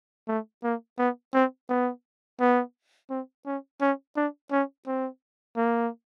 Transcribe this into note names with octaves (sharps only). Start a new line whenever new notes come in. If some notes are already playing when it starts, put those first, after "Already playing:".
A3
A#3
B3
C4
B3
B3
C4
C#4
C#4
D4
C#4
C4
A#3